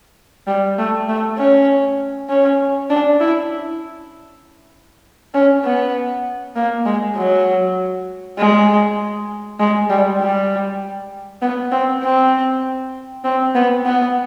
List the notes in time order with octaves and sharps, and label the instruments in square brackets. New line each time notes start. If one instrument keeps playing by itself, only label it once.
[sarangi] G3
A3
A3
C#4
C#4
D4
E4
C#4
B3
A#3
G#3
F#3
G#3
G#3
G3
G3
B3
C4
C4
C4
B3
B3